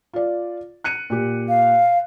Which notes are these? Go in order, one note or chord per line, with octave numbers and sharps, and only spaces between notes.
F4 D5
F#6 C#7 D#7
A#2 G4
F5